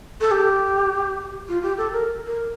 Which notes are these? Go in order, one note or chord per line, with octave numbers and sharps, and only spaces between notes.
A4
G4
F4
G4
A4
A#4
A#4